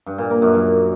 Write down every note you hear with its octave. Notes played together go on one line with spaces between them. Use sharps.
G2
A#2
A#3
F#2
F#2